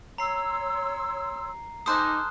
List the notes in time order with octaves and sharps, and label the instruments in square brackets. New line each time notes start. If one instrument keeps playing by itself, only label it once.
[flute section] C#5 C6 E6 [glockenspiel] A#5 C7
[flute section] D#4 D6 [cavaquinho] A4 C5 G#5 [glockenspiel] D#6 F6 F#6